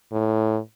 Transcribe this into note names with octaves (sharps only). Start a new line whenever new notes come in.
A2